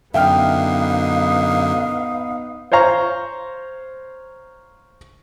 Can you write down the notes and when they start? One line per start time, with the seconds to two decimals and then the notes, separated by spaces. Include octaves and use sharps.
0.14 F#2 D3 B3 D#4 E5 F5 G5 F6
2.72 C5 C#5 F5 A#5 C#6